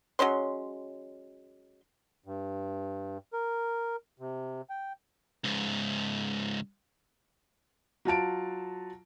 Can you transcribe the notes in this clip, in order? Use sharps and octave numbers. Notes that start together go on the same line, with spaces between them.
F#3 G#3 C#4 C6
G2
A#4
C3
G5
C#2 G#2
F#3 F4 A5 D7